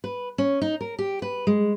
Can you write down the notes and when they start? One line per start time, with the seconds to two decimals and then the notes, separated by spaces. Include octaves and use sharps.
0.04 B4
0.38 C#4
0.61 D#4
0.81 A#4
0.99 G4
1.22 B4
1.47 G#3